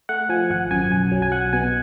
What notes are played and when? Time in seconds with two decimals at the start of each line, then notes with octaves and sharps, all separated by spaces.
0.09 A3 F#5
0.29 F3 G#5
0.50 G#1 F#5
0.71 F#2 G#5
0.92 B1 G#5
1.12 F#3
1.22 G#5
1.32 B1 F#5
1.53 B2 G#5